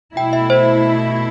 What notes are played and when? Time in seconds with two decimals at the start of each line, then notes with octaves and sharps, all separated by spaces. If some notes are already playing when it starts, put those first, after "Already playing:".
0.17 B2 A3 E4 G5
0.33 E5
0.50 C5